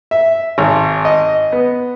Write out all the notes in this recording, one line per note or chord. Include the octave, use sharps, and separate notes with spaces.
E5
G#1
D#5
B3